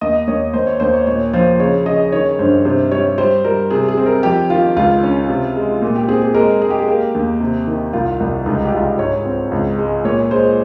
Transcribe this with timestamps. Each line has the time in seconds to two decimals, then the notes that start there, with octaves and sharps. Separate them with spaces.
0.01 D#2 D#5
0.27 D#2 C#5
0.54 D#2 C5
0.67 C#5
0.80 D#2 C5
0.94 C#5
1.07 A#2 C#5
1.33 F3 C5
1.59 C#3 C#5
1.86 C#3 D#5
2.12 D#3 C#5
2.39 G2 C5
2.65 C3 C5
2.92 G3 C#5
3.18 G3 C5
3.44 G3 A#4
3.71 C3 G#4
3.89 G#4
3.97 C4
4.06 A#4
4.23 F2 G4
4.50 D#3 F4
4.76 C#2 F4
5.03 C#4
5.29 C3
5.56 G#3
5.82 A#2
5.96 G4
6.08 C4 G#4
6.22 G#4
6.34 G#3 A#4
6.62 G#3 G#4
6.70 G4
6.79 G#4
6.88 A#3 G4
7.15 D#2
7.40 C3
7.67 D#3
7.93 C2 F4
8.20 C2
8.46 C#2 D#4
8.65 G4
8.72 C#2 F4
8.99 G#2 C#5
9.26 C4
9.52 C#2
9.79 G#3
10.04 A#2 C#5
10.31 G#3 C5